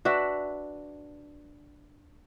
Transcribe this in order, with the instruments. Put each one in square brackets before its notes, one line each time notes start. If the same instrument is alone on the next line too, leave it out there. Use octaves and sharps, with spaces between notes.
[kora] D4 F#4 B4 E5